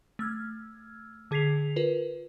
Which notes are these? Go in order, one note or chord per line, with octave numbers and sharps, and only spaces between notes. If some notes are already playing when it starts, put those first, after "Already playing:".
A3 E6 F6 G#6
D3 G#4 G#6 B6 C7 F7
F4 A#4 B4